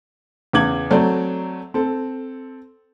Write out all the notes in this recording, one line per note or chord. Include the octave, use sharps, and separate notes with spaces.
E2 C#3 D6 G#6 F#7
F#3 A3 C4 A4 D5
C4 A4